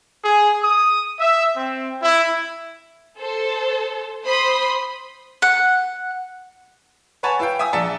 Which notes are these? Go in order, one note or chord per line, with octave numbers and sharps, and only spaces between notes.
G#4
D#6
E5
C4
E4
A4 C5
C5 B5 C6 D#6
F#5
B4 C#5 F#5 G#5 A5 B5
E4 B4 F5 G5
E5 G#5 D#6
A#1 D5 E5 A5 C#7